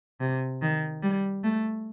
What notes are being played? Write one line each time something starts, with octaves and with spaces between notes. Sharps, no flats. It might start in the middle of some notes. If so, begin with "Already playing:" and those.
C3
D#3
G3
A3